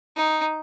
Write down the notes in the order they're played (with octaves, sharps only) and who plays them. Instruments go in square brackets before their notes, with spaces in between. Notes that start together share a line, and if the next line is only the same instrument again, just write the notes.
[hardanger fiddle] D#4